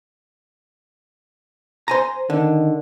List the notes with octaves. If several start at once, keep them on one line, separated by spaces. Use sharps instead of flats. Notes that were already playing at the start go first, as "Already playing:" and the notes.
C5 G#5 A#5
D3 D#3